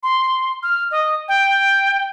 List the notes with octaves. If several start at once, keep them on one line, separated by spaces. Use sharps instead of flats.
C6
F6
D#5
G5